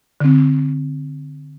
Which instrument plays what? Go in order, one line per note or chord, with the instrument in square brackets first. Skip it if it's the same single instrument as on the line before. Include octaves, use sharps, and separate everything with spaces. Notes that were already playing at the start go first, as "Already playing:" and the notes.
[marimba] D3 C4